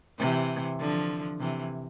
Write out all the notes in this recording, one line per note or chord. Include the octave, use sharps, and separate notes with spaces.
C3 E3
D3 F3
C3 E3